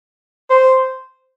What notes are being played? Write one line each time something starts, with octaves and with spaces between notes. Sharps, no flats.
C5